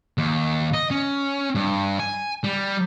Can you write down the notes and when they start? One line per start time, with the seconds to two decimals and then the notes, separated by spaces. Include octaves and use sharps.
0.18 D#2
0.74 D#5
0.91 C#4
1.55 G2
2.00 G#5
2.44 G3